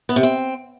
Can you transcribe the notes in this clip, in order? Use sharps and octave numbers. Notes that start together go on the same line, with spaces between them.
B3
C3
C4